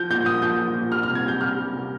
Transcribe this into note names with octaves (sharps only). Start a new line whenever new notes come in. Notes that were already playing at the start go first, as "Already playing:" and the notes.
Already playing: F3 G6
A#2 G6
A#2 D#6
F3 G6
F3
A#2
G3 F6
F6
C3
G#6
C3 G6
G3 F6
G3
C3